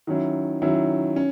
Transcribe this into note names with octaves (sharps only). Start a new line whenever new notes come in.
D#3 F#3 C#4 E4
D#3 F#3 C#4 E4
C#4